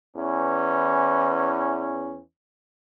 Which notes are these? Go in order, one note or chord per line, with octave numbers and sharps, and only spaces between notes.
E2 E3 C#4